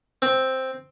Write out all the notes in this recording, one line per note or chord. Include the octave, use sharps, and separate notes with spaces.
C4